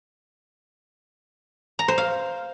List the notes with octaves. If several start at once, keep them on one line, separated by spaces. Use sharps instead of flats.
A#5
C5
F5